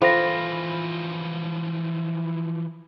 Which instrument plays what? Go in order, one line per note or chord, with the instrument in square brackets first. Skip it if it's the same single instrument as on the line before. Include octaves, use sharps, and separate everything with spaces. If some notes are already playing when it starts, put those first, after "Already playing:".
[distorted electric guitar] E3 F3 [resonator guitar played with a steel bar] F4 [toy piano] A4 C5 G5 [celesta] B5 A#6